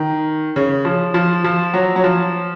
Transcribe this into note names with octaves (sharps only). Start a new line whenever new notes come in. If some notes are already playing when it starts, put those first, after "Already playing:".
Already playing: D#3
C#3
F3
F3
F3
F#3
F#3
F3